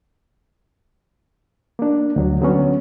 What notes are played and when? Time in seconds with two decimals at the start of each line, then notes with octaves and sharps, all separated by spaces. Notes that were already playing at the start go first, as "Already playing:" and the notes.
1.79 A#3 D4
2.16 D2 F#3
2.41 D3 F#3 B3 C#4